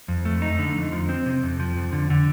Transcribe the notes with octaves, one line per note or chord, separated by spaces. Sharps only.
F2
A3
D#4
D3
F2
F3
C4
C3
F2
F3
F2
D3
D3